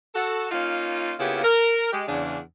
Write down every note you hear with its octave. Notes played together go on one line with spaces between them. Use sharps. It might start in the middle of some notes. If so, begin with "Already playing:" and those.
F#4 A4
A#3 C#4 D#4 F4
C#3 A#3 B3 E4 F4 G4
A#4
G#3 G4
E2 C#3 D4